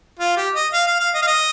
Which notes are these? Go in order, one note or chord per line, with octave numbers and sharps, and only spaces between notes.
F4
G4
D#5
F5
F5
F5
D#5
F5
D#5